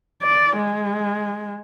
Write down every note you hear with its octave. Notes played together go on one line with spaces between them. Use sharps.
D5
G#3